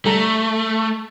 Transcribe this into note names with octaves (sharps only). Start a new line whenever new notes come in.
G3 A3 A4 A#5